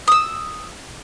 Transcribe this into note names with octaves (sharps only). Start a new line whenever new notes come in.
D#6 E6